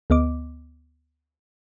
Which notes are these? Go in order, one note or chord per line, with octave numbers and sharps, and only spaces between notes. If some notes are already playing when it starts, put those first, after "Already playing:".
D2 B3 D#5 D6